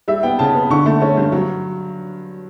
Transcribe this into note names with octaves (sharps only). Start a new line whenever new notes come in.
G3 E5
B3 G5
C#3 A5
B3
D3 C#6
A3
C#4
G2
F#3